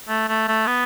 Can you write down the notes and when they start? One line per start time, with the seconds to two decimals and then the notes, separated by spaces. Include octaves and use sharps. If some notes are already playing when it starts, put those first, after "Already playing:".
0.09 A3
0.29 A3
0.48 A3
0.67 B3